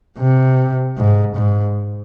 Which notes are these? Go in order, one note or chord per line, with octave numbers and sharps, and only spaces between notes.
C3
G#2
G#2